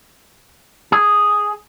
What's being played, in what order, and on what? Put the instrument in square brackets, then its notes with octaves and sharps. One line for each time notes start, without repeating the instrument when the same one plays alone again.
[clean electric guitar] G#4